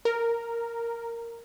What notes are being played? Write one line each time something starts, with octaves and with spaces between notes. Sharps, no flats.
A#4